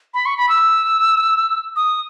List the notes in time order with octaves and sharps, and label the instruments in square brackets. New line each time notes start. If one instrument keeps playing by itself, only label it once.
[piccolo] B5
C#6
B5
E6
D#6